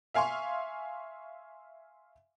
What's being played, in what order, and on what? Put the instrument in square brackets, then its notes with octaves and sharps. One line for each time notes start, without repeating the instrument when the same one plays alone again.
[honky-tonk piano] E5 F5 G#5 C6 C#6